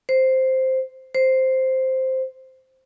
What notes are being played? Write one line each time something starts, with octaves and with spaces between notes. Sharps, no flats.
C5
C5